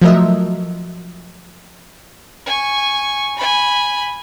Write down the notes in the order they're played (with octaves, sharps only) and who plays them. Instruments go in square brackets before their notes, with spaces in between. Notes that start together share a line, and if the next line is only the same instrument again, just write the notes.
[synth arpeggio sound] F3 F#3 A3 A#4 D#5 E5
[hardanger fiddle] G#5 C#6
G#5 B5